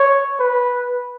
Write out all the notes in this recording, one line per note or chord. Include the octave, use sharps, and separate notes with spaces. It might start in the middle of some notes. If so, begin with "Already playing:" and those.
Already playing: C#5
B4